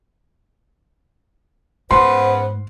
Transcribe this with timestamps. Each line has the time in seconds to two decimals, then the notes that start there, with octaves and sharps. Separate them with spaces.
1.91 G#2 C#3 B3 C5 C6